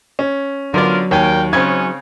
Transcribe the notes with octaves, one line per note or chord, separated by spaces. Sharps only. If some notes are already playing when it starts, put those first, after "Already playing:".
C#4
D3 F#3 B3 F4 A#4 D5
D#2 A#4 C#5 D5 G5 G#5
G#2 C#3 C4 C#4 G#6